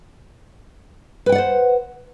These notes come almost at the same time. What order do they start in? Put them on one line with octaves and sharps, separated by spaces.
B4 G5 F#5 D5 C5